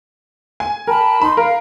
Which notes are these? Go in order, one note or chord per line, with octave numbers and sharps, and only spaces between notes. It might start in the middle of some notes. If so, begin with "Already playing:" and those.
G#5
A#4 G5 A5 B5
D#4 B5 C6
A#4 F5